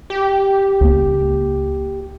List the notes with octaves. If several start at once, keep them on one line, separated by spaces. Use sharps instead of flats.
G4
C#2 A#3